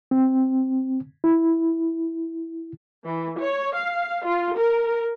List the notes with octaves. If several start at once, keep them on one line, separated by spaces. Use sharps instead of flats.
C4
E4
E3
C#5
F5
F4
A#4